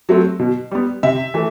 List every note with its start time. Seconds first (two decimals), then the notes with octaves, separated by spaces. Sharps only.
0.09 F#3 A3 C4
0.39 B2
0.71 G3 B3
1.03 C3 E5
1.34 E3 A3